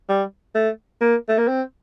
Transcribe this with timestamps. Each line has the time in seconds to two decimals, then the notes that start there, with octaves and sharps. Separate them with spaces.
0.09 G3
0.55 A3
1.01 A#3
1.29 A3
1.38 A#3
1.48 C4